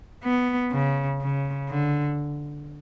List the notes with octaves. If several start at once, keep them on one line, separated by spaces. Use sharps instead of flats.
B3
C#3
C#3
D3